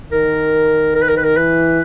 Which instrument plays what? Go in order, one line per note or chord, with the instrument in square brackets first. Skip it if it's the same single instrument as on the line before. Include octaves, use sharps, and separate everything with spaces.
[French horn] D#3 [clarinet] A#4
[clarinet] A#4
B4
A#4
B4
A#4
[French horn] E3 [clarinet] B4